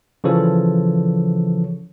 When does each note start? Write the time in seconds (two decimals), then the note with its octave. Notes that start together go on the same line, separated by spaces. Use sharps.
0.24 C#3 E3 F3 A4 C#5